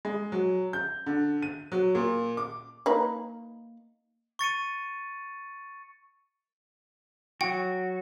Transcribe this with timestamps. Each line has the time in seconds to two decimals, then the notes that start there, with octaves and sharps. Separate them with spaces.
0.05 G#3
0.32 F#3
0.73 G6
1.06 D3
1.42 D#7
1.72 F#3
1.95 A#2
2.37 D6
2.86 A#3 D#4 B4
4.39 C#6 A6 C#7 D#7
7.41 F#3 F#4 G5